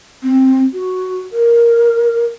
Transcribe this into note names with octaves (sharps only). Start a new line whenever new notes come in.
C4
F#4
A#4